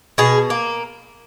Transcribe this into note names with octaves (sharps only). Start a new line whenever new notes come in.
B2 G#4
A#3